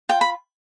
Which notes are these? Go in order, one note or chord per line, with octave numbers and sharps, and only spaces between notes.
F4 G5
B5